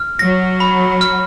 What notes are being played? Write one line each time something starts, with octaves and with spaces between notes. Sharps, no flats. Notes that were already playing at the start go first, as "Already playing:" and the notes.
Already playing: F6
F#3 A#6
B5
F6